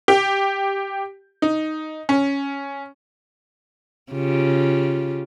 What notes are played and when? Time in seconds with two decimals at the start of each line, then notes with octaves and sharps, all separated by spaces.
0.08 G4
1.42 D#4
2.09 C#4
4.12 C#3 F4 G4